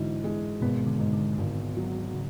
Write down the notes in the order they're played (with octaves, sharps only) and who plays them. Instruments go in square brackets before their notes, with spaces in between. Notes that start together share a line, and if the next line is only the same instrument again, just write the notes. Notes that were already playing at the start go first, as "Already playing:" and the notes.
Already playing: [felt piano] G#2 E3 D4 [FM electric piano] D3 E4 F#4
[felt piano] G#3
[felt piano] G#1 [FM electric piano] B2 B3
[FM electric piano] D3
[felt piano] G#2
[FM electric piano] D3
[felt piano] G#1
F#3
[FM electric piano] C#3